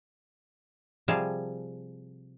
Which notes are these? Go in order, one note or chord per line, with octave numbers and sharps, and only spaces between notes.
C3 F3 G3 G#4 F5 A5